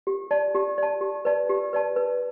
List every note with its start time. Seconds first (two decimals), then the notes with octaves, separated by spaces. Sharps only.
0.07 G4
0.31 D5 A5
0.55 G4
0.78 D5 A5
1.01 G4
1.25 B4 D5 A5
1.49 G4
1.73 B4 D5 A5
1.96 B4